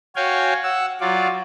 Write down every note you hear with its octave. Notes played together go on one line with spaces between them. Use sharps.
F#4 C#5 F5 G5 G#5
F#5 E6
F#3 F4 D5